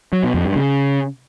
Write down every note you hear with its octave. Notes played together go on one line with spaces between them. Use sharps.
F#3
B2
F2
G2
C#3